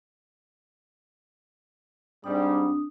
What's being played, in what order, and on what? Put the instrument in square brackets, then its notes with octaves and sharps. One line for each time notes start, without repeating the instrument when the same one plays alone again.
[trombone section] G#2 G3 [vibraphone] C4 D4 D#6